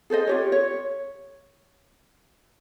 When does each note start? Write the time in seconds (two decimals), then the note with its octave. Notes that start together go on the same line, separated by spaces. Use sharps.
0.10 G#4 A4 C5 D#5
0.27 F4 G4 C#5
0.52 C#5